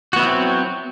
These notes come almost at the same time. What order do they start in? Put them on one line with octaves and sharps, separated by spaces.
F#4 B3 E4 F#3 C4